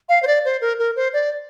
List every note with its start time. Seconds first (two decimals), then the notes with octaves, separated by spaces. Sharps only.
0.09 F5
0.23 C5
0.27 D5
0.45 C5
0.61 A#4
0.79 A#4
0.96 C5
1.13 D5